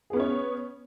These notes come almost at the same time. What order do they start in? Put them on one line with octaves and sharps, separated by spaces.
G#4 B3 C#4 C#5